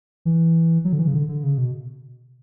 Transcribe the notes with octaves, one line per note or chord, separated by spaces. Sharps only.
E3
F#3
D3
E3
C#3
D3
D3
C#3
B2